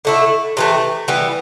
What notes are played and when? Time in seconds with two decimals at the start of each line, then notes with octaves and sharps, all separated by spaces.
0.05 D3 A3 E4
0.57 C3 E3 A3
1.08 E3 G3 B3